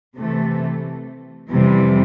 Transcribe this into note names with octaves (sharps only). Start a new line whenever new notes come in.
C3 E3 A3
F2 C3 E3 G3